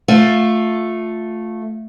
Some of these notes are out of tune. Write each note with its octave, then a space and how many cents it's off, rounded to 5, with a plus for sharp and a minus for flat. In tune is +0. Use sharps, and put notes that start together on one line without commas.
A3 +0 F4 +15